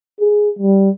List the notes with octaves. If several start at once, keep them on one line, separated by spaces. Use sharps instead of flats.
G#4
G3